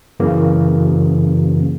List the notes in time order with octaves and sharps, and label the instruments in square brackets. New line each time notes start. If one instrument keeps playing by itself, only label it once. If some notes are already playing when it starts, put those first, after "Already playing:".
[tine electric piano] F#2 C#3 E3 A#3